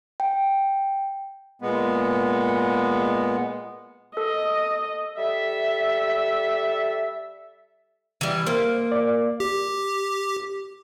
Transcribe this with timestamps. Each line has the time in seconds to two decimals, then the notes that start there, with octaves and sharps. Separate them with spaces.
0.20 G5
1.62 A#2 G#3 B3
4.17 A4 D#5
5.17 G3 A4 E5
8.21 E3 G3
8.47 A#3 C5
8.92 D5
9.40 G4